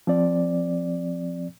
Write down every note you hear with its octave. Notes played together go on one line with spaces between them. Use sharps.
F3 C4 D5